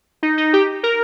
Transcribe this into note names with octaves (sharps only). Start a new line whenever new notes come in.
D#4
D#4
G4
A#4